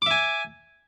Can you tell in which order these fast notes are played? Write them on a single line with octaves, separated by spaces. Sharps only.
D6 E5 G#5